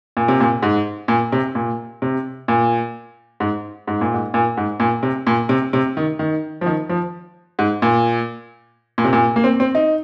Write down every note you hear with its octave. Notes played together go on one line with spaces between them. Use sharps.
A#2
C3
A#2
G#2
A#2
C3
A#2
C3
A#2
G#2
G#2
A#2
G#2
A#2
G#2
A#2
C3
A#2
C3
C3
D#3
D#3
F3
D#3
F3
G#2
A#2
A#2
C3
A#2
A#3
C4
C4
D#4